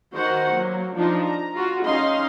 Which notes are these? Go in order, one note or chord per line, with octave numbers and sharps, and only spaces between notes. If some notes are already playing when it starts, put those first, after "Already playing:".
D#3 F#4 C5 F#5
F#3 A#3
F3 D4 D#4 F4
A#5
F4 F#4
C#4 D#4 D#5 F5 C6